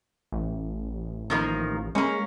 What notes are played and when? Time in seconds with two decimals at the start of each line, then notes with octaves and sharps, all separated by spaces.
0.32 A1
1.30 D#3 F3 A#3
1.95 G#3 A#3 C#4